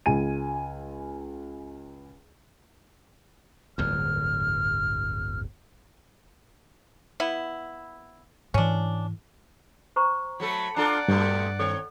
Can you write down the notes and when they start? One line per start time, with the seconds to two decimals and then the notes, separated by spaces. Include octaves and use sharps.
0.06 C#2 G#5 D#7
3.78 D1 G1 E2 F6
7.20 B3 E4
8.54 G#2 E3 C#4 D4
9.96 C5 A#5 C#6
10.40 F#3 A3 A4 B5
10.76 D4 F4 A4 D5 F#5 A5 A#5
11.08 G2 A#2 A3 C4
11.59 D#3 C4 A4 C#5